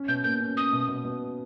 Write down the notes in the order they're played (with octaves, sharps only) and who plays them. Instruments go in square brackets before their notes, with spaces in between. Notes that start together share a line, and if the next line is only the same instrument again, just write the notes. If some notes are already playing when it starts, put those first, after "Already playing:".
Already playing: [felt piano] C#4
[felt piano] B2 [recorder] G6
[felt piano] A#3 [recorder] G6
[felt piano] C#4
[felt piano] C#4 [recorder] D#6
[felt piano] B2
B2
B2